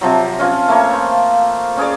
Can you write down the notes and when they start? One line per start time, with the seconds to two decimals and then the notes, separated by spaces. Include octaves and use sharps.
0.01 C3 F3 F#3
0.39 C#4 F4 F5 G#5
0.68 A3 A#3 C#5
0.93 C5
1.77 C#4 G#4 C#5 D5